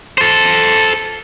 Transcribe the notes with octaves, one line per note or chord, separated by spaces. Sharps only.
A4 C5